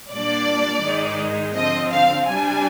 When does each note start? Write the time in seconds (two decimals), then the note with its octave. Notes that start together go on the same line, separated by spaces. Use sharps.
0.13 A#2 G3 A#3 D4 D5
0.85 G#2 D#3 G#3 D#4
1.56 D3 F3 C4 D#5
1.91 F5
2.27 C3 G3 D4 G#5